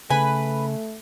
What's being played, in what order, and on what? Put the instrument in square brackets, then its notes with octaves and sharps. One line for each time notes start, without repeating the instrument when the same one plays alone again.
[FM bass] C#3 [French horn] A3 [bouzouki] B4 [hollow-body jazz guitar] G#5